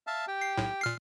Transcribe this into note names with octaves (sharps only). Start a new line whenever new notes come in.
E5 F5 A5
G4 G5
C7
B1 A2
A#2 F6 C7